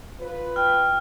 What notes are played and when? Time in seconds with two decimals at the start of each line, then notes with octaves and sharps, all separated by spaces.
0.20 F4 B4
0.56 G5 F6